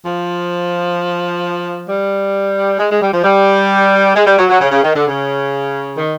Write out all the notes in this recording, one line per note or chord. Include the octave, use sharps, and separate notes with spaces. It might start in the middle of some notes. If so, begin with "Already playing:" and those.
F3
G3
G#3
G#3
G3
F3
G3
G#3
G3
F#3
F#3
C#3
C#3
D#3
D3
C#3
D#3